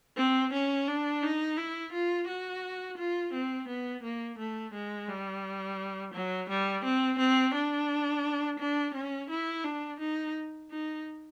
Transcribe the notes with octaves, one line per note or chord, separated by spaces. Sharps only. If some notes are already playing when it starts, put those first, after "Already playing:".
C4
C#4
D4
D#4
E4
F4
F#4
F4
C4
B3
A#3
A3
G#3
G3
F#3
G3
C4
C4
D4
D4
C#4
E4
D4
D#4
D#4